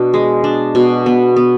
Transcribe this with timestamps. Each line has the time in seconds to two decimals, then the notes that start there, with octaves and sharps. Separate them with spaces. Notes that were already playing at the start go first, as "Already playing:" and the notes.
Already playing: B2 D4
0.14 G#3
0.44 D4
0.75 B2
1.06 B3
1.36 B3